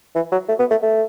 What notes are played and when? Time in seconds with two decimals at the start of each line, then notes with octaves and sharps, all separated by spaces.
0.15 E3
0.32 F#3
0.49 A3
0.59 B3
0.71 A3
0.82 A3